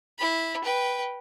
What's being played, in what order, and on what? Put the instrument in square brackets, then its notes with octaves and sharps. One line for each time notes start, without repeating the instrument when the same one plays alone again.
[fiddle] E4 B5
B4 G5